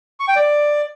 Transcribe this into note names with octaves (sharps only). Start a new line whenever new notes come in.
C#6
G5
D5